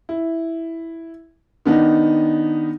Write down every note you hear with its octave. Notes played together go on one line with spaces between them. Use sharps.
E4
D#3 B3 D4 D#4